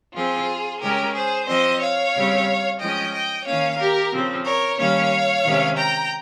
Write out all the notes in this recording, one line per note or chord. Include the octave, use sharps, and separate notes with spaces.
F3 C4 F4 G#4
C#3 G#3 C#4 G4 A#4
G#4 C5
F3 C4 C5 D#5
C#5 F5
C#3 G3 C4
F3 G#3 C#4 D#5 G5
D#5 G5
D#3 A#3 C#4 C#5 F5
G4 A#4
C#3 F3 C4
A#4 C#5
D#3 G3 A#3 C#4 C#5 F5
C3 D#3 G#3 C#4
G5 A#5